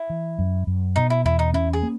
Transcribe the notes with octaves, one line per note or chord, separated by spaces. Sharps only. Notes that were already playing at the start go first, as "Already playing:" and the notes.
Already playing: E4
E3
F#2
F#2
B2 D#4
E4
E2 E4
D#4
C#4 E4
G#4
A#3